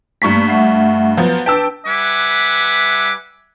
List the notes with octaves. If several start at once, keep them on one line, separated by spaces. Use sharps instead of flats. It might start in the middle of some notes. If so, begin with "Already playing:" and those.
G2 A3 A#3 C#6 B6
A3 E5 F#5
F3 F#3 B3
D4 B4 G5 A5 E6
G3 B4 E5 F#5 G#5 D6